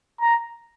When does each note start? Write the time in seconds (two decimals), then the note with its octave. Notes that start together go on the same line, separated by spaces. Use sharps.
0.21 A#5